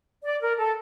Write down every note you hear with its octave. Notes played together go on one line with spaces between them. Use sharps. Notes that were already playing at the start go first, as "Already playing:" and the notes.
D5
A#4
A4